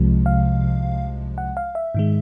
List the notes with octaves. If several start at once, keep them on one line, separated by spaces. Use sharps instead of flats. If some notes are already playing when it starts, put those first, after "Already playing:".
Already playing: C2 C3 F3 G#3
F5
F#5
F5
E5
G#2 D#3 G#3